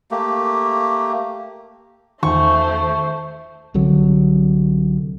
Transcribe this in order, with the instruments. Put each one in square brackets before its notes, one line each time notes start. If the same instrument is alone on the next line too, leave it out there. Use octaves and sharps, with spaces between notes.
[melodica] A3 A#3 G4
[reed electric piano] E2 D#3 [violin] A3 C5 [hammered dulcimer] C#6
[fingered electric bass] C2 D3 F#3